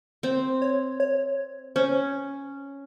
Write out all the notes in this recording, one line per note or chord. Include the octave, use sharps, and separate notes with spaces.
C4 C5
C#5
C#5
C#4 C5